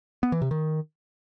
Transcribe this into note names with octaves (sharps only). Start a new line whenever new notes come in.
B3
E3
C3
D#3